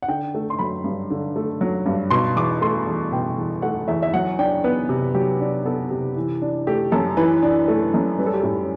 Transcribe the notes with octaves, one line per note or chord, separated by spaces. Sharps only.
F#5
D3 G5
A3
C6
F#3 B5
G2
D3
A3
F#3
G2
B2 C6
E2 D6
A3 C6
E2
B2 G5
E2
A3 F#5
E2 E5
E5
F#3 F#5
D4 G5
B3 B4
C3
F#3 G4
D4
B3 A4
C3
E3
D4
A3 G4
F#2 A4
E3 B4
D4
A3
F#2
G3 B4
A4
G4
A2 A4